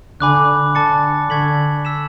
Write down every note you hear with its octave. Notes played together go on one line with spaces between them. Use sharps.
D3 G#5 B5 D6 F#6
D3 A5 D6 A6 C#7
D3 C#6 G#6 B6 F#7
E6 B6 E7